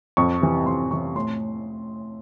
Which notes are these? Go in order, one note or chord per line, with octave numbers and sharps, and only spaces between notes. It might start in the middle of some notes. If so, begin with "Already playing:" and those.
F2 C#6
C3 E3
F2 C6
C3 E3 C#6
A2 C6